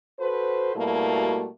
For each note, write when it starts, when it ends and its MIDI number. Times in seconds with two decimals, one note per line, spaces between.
0.20 0.73 66
0.20 0.73 69
0.20 0.73 71
0.20 0.73 72
0.75 1.48 47
0.75 1.48 55
0.75 1.48 57
0.75 1.48 58
0.75 1.48 64
0.75 1.48 66